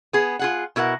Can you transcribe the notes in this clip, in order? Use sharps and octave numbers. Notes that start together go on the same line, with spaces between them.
B3 G#4
F4 G#4 F#5
B2 E4 A#4 F#5